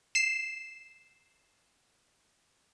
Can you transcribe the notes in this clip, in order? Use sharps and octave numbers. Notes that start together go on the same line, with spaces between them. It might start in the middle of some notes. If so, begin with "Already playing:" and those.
C7 E7